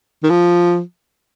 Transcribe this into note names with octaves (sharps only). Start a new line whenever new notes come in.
D#3
F3